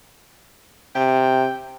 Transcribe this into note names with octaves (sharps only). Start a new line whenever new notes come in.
C3 G5